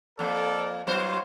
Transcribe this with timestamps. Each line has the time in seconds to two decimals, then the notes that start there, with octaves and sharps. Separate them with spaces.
0.19 F2 A#3 A4 A#4 D5
0.87 F#3 B3 D#4 F4 C5 C#5